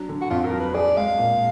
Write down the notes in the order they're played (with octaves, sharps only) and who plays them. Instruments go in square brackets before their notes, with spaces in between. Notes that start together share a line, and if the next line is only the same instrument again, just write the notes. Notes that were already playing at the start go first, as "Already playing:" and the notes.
Already playing: [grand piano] F#3 D4
D3
[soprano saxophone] F#4
[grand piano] F2 [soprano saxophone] F4
[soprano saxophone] A#4
[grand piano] F#3
[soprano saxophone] B4
[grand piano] G#4 [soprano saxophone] D5
[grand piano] G#3 [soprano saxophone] F5
[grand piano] A#2